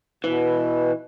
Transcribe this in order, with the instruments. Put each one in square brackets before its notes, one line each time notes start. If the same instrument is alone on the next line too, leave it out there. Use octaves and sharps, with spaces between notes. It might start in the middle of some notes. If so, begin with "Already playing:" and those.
[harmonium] B2 [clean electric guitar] E3